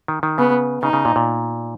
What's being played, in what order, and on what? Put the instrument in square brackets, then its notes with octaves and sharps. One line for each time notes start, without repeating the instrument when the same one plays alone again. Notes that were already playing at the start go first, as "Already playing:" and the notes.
[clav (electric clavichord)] D#3
D#3
[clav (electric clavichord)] C#3 [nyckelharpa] B3
[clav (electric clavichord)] C#3 [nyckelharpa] D#4
[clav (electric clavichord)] C#3
A#2
A#2